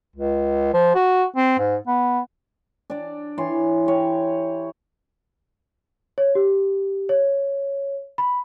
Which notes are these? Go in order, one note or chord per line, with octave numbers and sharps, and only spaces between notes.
C#2
F3
F#4
C4
G#2
B3
D4 D5
E3 C#5 C6
G4 C#5
C#5
G4
C#5
B5